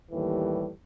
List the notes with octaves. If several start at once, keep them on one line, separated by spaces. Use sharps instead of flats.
D#2 A2 E3 G3